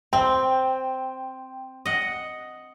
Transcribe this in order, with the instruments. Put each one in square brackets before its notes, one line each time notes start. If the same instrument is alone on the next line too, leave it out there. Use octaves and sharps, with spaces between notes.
[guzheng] C4 [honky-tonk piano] G5
[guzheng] D#5 F#5